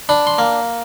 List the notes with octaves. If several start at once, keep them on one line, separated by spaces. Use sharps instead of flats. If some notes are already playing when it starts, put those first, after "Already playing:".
D4 B5
C6
A#3